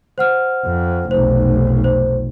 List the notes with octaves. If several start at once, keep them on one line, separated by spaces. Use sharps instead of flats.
C5 F#5 F6
F2
F1 B1 C5
C5